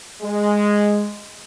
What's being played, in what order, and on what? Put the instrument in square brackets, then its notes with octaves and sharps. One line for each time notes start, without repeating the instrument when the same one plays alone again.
[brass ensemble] G#3